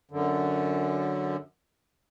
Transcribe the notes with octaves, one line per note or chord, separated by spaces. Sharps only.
F#2 D3